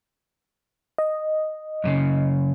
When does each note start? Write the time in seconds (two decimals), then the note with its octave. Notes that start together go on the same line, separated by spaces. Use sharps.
0.98 D#5
1.84 F#2 A#2 C#3